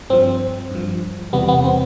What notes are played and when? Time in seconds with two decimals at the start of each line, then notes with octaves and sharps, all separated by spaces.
0.10 G2 F3 C4
0.71 G2 F3
1.33 E2 C3 G3 B3
1.48 B3
1.64 C4